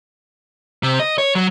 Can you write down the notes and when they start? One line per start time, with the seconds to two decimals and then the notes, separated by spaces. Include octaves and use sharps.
0.83 C3
0.99 D#5
1.18 C#5
1.35 F#3